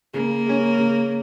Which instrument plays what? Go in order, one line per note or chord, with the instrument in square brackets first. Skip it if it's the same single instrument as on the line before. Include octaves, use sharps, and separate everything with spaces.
[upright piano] C#3 [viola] A#3
[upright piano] G#3 C#4
C#3